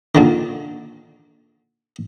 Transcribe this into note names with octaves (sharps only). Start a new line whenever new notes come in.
A#2 D3 D#3